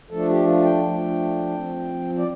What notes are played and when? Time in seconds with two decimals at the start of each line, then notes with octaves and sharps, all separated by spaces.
0.11 F3 A3 D4 A4
0.29 G4
0.47 F4
0.65 G5
0.83 F3 A3 D4
1.55 F3 C4
2.18 D5